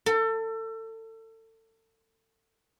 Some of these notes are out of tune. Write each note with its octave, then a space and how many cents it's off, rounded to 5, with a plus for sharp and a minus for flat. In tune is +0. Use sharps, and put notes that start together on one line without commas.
A4 +30